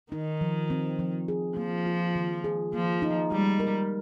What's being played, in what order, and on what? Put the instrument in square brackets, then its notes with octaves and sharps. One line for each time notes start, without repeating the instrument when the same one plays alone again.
[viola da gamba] D#3 [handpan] D#4
[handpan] F3
C4
F3
G#4
[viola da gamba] F3 [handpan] A#3
[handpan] F4
D#3
G#4
[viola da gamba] F3 [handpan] A#3
[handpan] D#4
[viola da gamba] G3 [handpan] G#3
[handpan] A#4